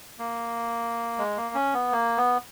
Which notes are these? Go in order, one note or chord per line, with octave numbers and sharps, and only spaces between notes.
A#3
G#3
A#3
C#4
B3
A#3
B3